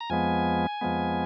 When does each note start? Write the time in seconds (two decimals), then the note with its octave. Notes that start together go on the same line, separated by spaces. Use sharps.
0.01 A#5
0.10 F2 F3 G#3 B3 G#5
0.81 F2 F3 G#3 B3